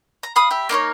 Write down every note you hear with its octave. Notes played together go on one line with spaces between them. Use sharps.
A#5
F5 B5 D#6
G4 E5
A#3 D#4 C5 C#5